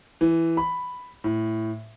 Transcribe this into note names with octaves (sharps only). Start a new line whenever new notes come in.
E3
B5
A2